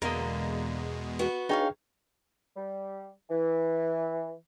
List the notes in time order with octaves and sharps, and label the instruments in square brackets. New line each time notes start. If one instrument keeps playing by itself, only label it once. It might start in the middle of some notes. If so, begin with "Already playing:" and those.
[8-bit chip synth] E2 B2 G#3 [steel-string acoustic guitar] D3 A#3 [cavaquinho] A#4 D#5
[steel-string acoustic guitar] B3 F#4
[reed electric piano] D4 G#4 G5 [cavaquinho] D#4 C#5 F5
[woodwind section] G3
E3